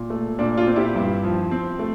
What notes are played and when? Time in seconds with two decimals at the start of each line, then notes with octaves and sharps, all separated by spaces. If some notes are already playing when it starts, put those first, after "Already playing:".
Already playing: A#2
0.10 A3
0.39 A#2 D4
0.57 D4 F4
0.67 C4
0.76 E4 G4
0.96 G2
1.23 F3
1.51 C4
1.79 A3